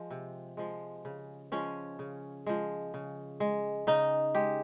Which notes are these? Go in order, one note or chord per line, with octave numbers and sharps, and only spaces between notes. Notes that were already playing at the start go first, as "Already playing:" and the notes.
Already playing: F3 G#3
C3
F3 G#3
C#3
F3 G#3 C#4
C#3
F3 G#3
C#3
G#3
C#3 D#4
G#3 G4